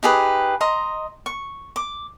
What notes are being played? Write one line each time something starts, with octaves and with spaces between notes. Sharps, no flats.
D#4 G4 G#4 B4
D#5 A#5 C6
C#6
D6